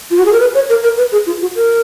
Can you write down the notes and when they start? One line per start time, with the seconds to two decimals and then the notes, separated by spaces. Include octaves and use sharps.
0.11 F4
0.18 F#4
0.26 G#4
0.33 A#4
0.40 B4
0.55 C#5
0.69 A#4
0.83 A#4
0.98 B4
1.12 G#4
1.27 F4
1.41 F#4
1.56 A#4